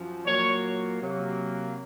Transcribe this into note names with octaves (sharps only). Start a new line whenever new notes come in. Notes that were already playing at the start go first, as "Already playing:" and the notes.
Already playing: F#2 F3
A#2 F#3 A#3 C#5
C3 F#3 A#3